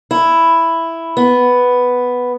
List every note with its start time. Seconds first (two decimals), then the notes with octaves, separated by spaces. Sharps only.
0.11 E4
1.17 B3